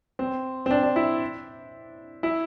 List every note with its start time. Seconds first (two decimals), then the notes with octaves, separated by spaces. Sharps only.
0.19 C4
0.66 C4
0.71 D4
0.83 D4
0.96 E4
2.23 E4